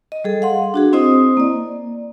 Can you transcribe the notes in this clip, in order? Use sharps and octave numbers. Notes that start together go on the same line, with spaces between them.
D#5
G3 G#4 A4
F5 F#5 C6
D4 F#4 G#4
C4 E4 C5 D#5 D#6
A#3 D5